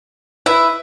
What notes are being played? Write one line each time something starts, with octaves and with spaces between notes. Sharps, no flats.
E4 B4 E5